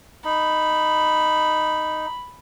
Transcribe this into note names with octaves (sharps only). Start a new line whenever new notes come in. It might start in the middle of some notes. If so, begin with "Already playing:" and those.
D#4 B5